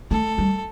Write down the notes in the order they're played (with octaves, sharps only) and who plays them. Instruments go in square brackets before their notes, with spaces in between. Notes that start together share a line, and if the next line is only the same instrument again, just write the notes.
[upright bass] A3 [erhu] A4
[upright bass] G3